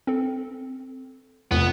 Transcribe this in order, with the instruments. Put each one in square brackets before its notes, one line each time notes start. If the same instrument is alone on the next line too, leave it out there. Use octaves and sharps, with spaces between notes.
[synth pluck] C4 A4
[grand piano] F1 [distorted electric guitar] B3